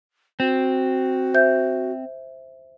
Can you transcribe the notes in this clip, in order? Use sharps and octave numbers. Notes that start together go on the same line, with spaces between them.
C4 F#4
C5 E5 G6